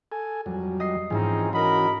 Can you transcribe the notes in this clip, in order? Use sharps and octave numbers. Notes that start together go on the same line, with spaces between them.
A4 G#5
F2 F#3 G3
D#5 C7
G#2 E3 F3 C4 C#4 D#4 G#4
E3 C#4 F#4 A#4 D#5 B5